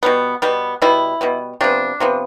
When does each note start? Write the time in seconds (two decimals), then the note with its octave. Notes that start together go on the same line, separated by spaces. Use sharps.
0.03 B2 G3 B3
0.42 B2 G3 B3
0.82 B2 G3 B3 E4
1.21 B2 G3 B3
1.61 C3 F3 B3 D4
2.00 C3 F3 B3